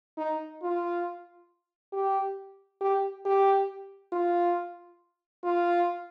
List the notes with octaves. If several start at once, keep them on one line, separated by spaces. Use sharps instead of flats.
D#4
F4
G4
G4
G4
F4
F4